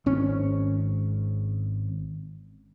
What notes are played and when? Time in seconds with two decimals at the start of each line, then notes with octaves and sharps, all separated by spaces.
0.06 G#1 C#4